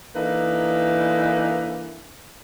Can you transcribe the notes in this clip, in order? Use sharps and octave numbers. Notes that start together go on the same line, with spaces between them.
E3 A#3 D4 D#4 A4 B4